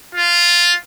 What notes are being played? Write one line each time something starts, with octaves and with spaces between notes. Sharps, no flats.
F4